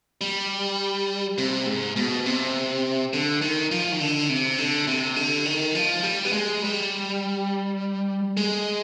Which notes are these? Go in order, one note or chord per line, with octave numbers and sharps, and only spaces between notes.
G3
C3
G#2
B2
C3
D3
D#3
F3
D#3
D3
C3
D3
C3
D3
D#3
F3
G3
B3
G#3
G3
G#3